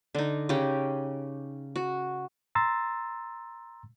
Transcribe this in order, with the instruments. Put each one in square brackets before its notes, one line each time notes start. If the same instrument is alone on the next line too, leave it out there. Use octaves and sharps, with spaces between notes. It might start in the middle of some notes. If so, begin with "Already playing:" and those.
[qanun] D3 D#4
C#3 C#4 G4 A#5
F#4
[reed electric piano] A#5 C6 E6 A6